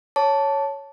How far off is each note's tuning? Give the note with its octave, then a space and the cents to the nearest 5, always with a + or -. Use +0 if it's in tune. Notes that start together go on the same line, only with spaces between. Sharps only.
C#5 +0 A5 +0 D6 -35